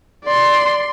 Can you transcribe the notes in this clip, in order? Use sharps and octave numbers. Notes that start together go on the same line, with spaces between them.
D5 C6